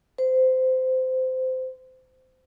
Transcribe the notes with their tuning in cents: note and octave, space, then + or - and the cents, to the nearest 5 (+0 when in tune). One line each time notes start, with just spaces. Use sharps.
C5 -20